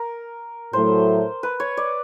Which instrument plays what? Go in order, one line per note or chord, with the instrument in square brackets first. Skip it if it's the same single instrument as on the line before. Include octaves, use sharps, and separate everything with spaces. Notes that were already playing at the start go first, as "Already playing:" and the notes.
Already playing: [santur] A#4
[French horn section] A2 F#3 A3 [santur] C5
[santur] B4
C#5
D5